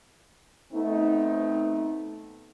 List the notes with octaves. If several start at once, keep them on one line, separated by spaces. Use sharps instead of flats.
A3 B3 C4 D#4